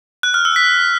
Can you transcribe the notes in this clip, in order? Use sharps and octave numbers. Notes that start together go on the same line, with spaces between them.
F#6
F6
E6
B6